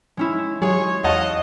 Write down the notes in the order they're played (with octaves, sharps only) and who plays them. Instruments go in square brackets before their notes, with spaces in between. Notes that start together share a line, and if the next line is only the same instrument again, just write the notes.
[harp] G#3 C#4 E4
[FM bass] F#3 [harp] G#3 [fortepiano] G#4 [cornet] C#5
[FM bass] E2 [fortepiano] C#5 F#5 A5 [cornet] D#5 [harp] F5